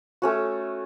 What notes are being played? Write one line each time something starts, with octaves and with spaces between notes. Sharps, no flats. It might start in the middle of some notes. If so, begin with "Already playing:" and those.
A3 C#4 F#4